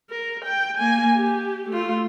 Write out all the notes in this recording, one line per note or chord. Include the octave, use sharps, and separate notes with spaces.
A#4
G5
A#3 G#5
G4
A3 F4